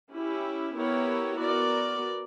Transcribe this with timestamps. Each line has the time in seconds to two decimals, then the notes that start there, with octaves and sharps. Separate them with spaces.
0.13 C#4 E4 G4
0.76 B3 E4 G4 A#4 C#5
1.39 B3 F#4 A#4 D5